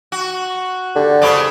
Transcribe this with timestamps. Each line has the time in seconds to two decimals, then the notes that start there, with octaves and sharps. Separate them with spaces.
0.12 F#4
0.95 D3 G4
1.21 C#3 F#3 C5 D5 B5 D#6